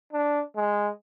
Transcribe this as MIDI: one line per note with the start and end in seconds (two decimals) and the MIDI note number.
0.13 0.42 62
0.56 0.89 56